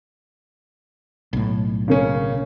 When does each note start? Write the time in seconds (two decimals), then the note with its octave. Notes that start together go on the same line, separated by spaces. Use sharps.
1.33 B1 A2
1.88 C#3 A#3 C#4